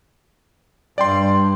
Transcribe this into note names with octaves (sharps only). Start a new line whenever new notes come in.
G2 D5 G5 C6